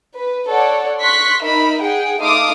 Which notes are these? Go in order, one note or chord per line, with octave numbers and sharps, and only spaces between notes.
B4
A4 C#5 D5 F#5
C6 C#6 F#6 B6
D#4 A#4 E5 B5
G#4 F#5 G5
A3 D#4 F5 C6 D6 D#6